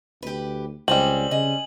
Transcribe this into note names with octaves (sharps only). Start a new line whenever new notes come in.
D2 G4 B4
C#2 G3 C4 D#5 G#5 F#7
C#3 D#5 G#5